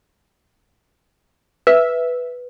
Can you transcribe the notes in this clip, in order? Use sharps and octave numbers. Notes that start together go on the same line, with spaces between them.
B4 E5